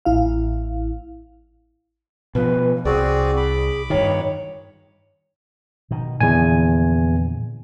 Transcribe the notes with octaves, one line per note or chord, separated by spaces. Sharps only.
A1 E4 F5
B2 F3 B4
C2 C4 F#4 G#4 D5
B5 D6
G2 D#3 C#5
B2 D#3
E2 A#2 D3 F3 G#5